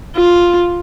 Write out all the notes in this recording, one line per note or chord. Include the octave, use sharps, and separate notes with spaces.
F4